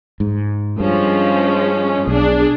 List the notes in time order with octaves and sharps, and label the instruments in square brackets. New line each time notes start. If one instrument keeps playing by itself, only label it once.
[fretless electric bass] G#2
[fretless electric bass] G2 [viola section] F3 G#3 C#4
[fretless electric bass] B1 [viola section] D4 G#4